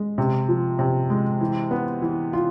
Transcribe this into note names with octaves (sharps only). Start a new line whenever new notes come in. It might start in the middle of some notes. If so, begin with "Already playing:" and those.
Already playing: G#3
C3
F3
C3
G#3
E3
B3
E3
F4